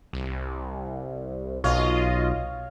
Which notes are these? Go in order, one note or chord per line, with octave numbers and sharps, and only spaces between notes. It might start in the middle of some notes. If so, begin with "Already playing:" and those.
C2
B1 F4 C#5 D#5 F5